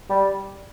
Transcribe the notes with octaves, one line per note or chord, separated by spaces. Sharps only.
G3